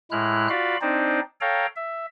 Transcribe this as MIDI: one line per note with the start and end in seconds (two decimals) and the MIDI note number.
0.11 0.48 45
0.11 0.48 56
0.11 0.48 64
0.11 0.48 89
0.11 0.48 90
0.49 0.77 65
0.49 0.77 66
0.49 0.77 74
0.49 0.77 77
0.49 0.77 83
0.81 1.20 60
0.81 1.20 62
0.81 1.20 63
0.81 1.20 72
0.81 1.20 74
1.41 1.66 69
1.41 1.66 73
1.41 1.66 77
1.41 1.66 79
1.41 1.66 82
1.76 2.06 76